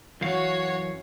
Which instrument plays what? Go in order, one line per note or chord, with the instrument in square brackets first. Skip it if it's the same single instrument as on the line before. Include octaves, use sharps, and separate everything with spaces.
[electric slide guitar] F#2 E3 F5 [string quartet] F#4 C#5